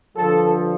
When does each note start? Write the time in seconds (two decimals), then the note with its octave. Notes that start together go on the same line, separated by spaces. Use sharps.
0.15 G2 D3 F3 A4